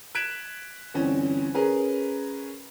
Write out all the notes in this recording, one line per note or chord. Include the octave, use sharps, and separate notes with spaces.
F#6 G#6 B6 D7 E7
G1 E3 C4 C#4
C#4 G#4 A#4 B4